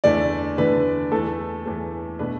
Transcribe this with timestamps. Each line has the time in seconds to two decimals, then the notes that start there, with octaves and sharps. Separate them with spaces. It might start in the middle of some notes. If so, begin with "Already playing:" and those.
0.04 E2 D3 A3 D5
0.57 E2 D3 A3 B4
1.12 E2 E3 A3 A4
1.65 E2 E3 A3
2.19 B2 A3 D4 B4